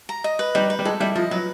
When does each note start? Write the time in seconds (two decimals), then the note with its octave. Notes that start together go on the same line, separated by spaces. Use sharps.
0.09 A#5
0.24 D#5
0.39 B4
0.55 G3 D#4
0.70 B4
0.79 G3
0.85 G#3 A4
1.00 G3 E4
1.15 F3 D#5
1.31 F#3 B4